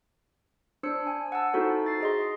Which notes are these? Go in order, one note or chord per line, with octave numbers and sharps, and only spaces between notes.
D4 C5 E6 C#7
G#5
F#5 A5 E6
D#4 E4 F#4 A4 C5
A6 C7
G#4 D#5 C6